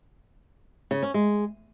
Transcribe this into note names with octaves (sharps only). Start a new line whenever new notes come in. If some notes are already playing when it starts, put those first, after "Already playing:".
C#3
C#4
G#3